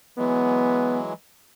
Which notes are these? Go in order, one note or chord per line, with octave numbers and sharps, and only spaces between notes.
E3 F#3 G#3 B3